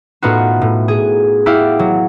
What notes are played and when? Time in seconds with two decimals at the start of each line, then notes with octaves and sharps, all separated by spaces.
0.22 A2 B3 D#4 F4 F#4
0.61 A2
0.88 G#4
1.46 E4 F#4 G4 F5
1.79 F#3